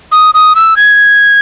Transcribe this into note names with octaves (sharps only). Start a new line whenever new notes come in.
D#6
D#6
E6
G#6